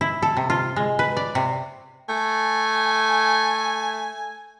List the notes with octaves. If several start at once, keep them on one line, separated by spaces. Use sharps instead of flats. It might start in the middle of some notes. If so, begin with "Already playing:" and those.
E4
A4
C3
F4
G#3
B4
D5
C3
A3 G#5